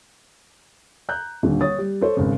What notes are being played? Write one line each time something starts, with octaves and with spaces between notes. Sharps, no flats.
A#5 F#6 G6
D#1 D3
C#5 D#6 A6
G3
A4 C5 C#5
G#1 C#3